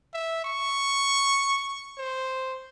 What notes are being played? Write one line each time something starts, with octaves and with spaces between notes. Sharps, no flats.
E5
C#6
C5